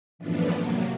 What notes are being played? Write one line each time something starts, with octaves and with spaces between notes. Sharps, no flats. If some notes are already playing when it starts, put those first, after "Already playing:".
F#2 A2 E3 F3 B3 D4
C3 F#3 A#3